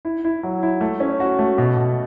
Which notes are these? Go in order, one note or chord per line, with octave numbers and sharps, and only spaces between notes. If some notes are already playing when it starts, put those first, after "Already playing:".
E4
E4
F#3
E4
A3
C#4
F#4
A3
B2
B2